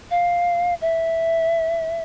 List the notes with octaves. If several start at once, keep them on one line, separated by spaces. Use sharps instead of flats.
F5
E5